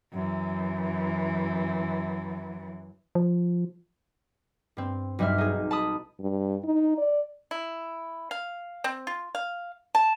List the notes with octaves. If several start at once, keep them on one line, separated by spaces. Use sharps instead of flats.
F#2 E3
F3
G2 C4
B1 G2 G3 E5 F6
D#4 G#4
A5 B5 D#6
G2
D#4
D5
E4
F5
C4
F4
F5
A5